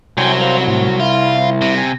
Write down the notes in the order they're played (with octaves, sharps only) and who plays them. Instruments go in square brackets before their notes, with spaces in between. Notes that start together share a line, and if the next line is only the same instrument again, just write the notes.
[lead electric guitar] C2 [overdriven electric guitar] F#3 [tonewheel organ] G5 G#5 C6
[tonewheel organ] C5 F5 F6
A2
[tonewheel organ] E4 [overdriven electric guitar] F4
[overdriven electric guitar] C3
[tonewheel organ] G#5